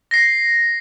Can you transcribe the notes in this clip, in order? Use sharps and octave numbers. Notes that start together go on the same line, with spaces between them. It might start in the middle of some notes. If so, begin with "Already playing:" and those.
A#6 C7